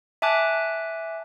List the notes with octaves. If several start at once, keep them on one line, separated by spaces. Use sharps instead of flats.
E5 G#5 A5 D6 F#6